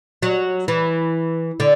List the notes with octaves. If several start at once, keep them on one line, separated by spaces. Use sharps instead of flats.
F#3
E3
D3